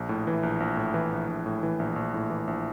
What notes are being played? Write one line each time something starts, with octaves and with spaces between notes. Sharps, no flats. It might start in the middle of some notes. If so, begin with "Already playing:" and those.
Already playing: A#1
A2
E3
A#1
A#1
A2
E3
A#1
A#1
A2
E3
A#1
A#1
A2
E3
A#1